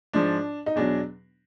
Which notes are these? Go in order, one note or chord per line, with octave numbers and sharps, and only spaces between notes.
G#2 F3 D4
D#4
E2 B2 F#3 D4